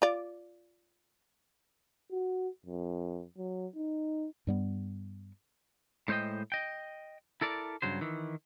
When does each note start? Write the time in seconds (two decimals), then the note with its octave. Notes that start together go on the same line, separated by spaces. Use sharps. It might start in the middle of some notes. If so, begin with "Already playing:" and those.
0.02 F4 D5
2.12 F#4
2.66 F2
3.37 F#3
3.75 D#4
4.47 G2 G3 B3
6.08 A2 G#3 C5 C#5 D#5 G5
6.52 D#5 G5
7.41 E4 A4 A#4 D5
7.82 G2 C#3 F#3 C5
8.01 D#3 E3